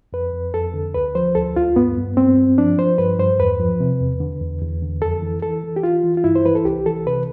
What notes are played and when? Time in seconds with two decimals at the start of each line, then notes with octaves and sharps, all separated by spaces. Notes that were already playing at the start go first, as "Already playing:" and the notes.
0.13 F2 B4
0.33 F2
0.54 F2 A4
0.74 D3
0.94 D2 B4
1.15 F3 C5
1.35 D2 A4
1.56 D2 F4
1.76 G2 B3
1.97 G2
2.17 G2 C4
2.38 G2
2.58 F3 D4
2.78 F3 C5
2.98 G2 B4
3.19 G2 C5
3.39 E2 B4
3.59 F3
3.80 C3
4.00 E2
4.20 D3
4.41 E2
4.62 E2
4.82 D3
5.02 F2 A4
5.22 E3
5.42 E3 A4
5.64 E3
5.76 G4
5.83 E3 F4
6.04 E3
6.17 F4
6.24 G2 E4
6.36 C5
6.46 E3 B4
6.55 A4
6.65 C2 G4
6.86 E3 A4
7.07 C3 B4